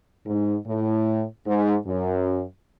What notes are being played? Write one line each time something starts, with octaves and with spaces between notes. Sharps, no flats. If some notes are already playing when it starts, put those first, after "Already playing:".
G#2
A2
G#2
F#2